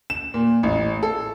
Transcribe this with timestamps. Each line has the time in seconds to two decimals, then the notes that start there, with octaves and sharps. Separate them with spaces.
0.10 E7
0.34 A#2
0.63 A1
1.03 A4